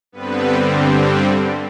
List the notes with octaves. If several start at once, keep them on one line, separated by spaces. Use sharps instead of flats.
G2 D3 G3 B3 C4 B4